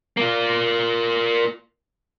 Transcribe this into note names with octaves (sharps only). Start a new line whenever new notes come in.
A#3 F4